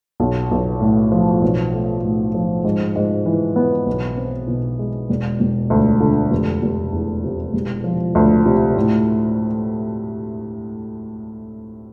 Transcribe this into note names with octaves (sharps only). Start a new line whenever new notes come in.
B1
B1
A2
F3
B1
A3
A2
F3
G#2
G#2
E3
B3
B1
C4
B2
G#3
E1
E1
D2
D3
F1
F1
E2
C3
E1
F3
D2
C3
A2